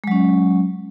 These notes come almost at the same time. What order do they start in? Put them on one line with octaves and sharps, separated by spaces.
G#3 F#3 C#4